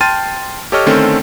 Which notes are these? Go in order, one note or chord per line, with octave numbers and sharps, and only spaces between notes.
G5 A5 C6 F6 A6 D#7
G4 A4 C#5 D#5 C#6 F6
D3 D#3 A3 C4 C#4 A4